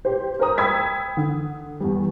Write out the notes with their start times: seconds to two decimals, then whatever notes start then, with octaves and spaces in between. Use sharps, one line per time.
0.05 G4 C5
0.39 A#4 C5 A#5 D#6
0.58 G5 B5 E6 G#6 B6
1.17 D3
1.80 E2 G3